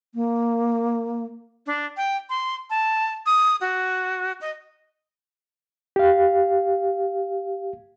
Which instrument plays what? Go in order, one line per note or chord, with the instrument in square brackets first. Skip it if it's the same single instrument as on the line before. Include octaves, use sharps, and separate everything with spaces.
[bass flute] A#3
[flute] D4
G5
C6
A5
D#6
F#4
D#5
[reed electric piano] G4 F5